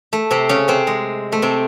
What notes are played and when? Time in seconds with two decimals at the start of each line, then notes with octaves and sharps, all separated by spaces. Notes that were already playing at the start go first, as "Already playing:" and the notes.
0.13 A3
0.31 C3 C4
0.49 C#3 C#4
0.68 C3 C4
0.87 G#3
1.32 A3
1.42 C3 C4